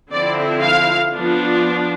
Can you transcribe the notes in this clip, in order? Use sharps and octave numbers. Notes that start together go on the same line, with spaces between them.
D3 F3 C4 E4 D5
F5
F3 B3 D4